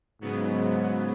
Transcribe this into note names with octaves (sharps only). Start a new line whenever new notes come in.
G#2 C#3 F#3 B3